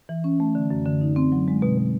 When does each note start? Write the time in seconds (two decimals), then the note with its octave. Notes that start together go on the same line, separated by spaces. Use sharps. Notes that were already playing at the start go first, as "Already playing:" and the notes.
0.09 E3
0.24 C#4
0.40 A3
0.55 D3
0.70 F#2
0.86 D3
1.01 D#4
1.16 C4
1.32 F#3
1.48 G#3
1.62 B2
1.78 B2